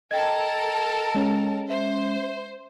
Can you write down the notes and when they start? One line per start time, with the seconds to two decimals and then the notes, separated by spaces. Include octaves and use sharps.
0.11 A4 A#4 D#5 G5 A5 G#6
1.15 G#3 C#4
1.70 C5 E5